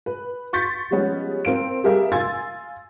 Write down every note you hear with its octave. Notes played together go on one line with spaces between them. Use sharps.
B4
C6 C#6 G6 A6 B6 C#7
F3 G3 G#3 B3 C#4
C4 A#4 F5 D7
G3 G4 G#4 A#4 E5 F5
F5 G#5 C6 E6 G#6 A6